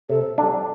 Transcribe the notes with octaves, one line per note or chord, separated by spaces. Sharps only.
C3 A4
G3 D4